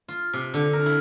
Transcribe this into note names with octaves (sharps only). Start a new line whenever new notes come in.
F4
C3
D3
A#4
E4